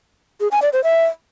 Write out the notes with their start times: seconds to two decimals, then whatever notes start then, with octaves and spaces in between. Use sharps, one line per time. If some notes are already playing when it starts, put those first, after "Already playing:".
0.41 G#4
0.51 G#5
0.62 D5
0.73 C5
0.84 E5